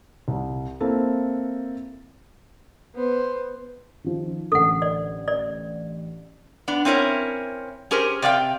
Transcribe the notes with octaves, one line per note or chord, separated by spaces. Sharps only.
C2
A#3 C4 E4 A4
B3 C5
D#3 F3
A1 D3 A4 F#5
D5
D5
B3 D4
C4 C#4 E4 A#4 C#5
C#4 G4 G#4 A#4 C5
C3 D5 F5 G5